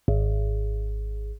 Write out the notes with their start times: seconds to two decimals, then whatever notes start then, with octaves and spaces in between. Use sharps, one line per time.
0.08 G#1